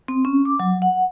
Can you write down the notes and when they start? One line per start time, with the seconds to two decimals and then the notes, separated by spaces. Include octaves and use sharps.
0.08 C4
0.25 C#4
0.45 D6
0.60 F#3
0.82 F#5